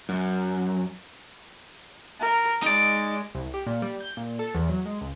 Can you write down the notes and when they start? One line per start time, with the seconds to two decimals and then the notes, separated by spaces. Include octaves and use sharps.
0.09 F#2
2.21 A#4
2.62 G#3 D#4 D5
3.35 C2
3.54 G4
3.67 A#2
3.82 G3
4.01 G6
4.17 A#2
4.39 A4
4.55 E2
4.69 F#3
4.85 G#3
5.01 C#2